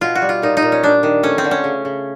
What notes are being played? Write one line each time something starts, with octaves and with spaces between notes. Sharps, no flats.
B2 F4
F#4
G3
F4
A#2 D#4
D#4
A#2
C#4
G3 D4
D#3
A3 C#4
C4
D3
C#4
C#3
C#3